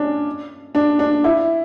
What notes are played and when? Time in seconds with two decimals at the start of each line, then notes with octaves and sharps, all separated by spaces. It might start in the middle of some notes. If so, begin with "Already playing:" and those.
Already playing: C#4 D4
0.75 D4
0.99 D4
1.24 E4